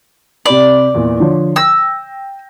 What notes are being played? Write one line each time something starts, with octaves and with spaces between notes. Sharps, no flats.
C3 G4 D5 B5
E2 A#2 E3
D3 F3 C#5
G5 E6 A#6